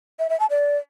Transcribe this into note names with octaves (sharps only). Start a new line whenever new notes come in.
E5
E5
A5
D5